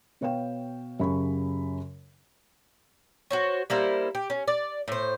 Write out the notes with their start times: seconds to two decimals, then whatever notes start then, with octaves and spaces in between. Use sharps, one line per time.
0.21 B2 B4 C#5 F5 G5 E7
1.00 F#2 C#3 G4 B5 C#6
3.31 F#4 C5 C#5
3.70 G3 A#3 E4 C5
4.15 G4
4.30 C#4
4.48 D5
4.88 A2 C5